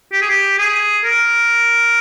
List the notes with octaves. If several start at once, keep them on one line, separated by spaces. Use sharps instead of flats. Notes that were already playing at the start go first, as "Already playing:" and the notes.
G4
G#4
G4
G#4
A#4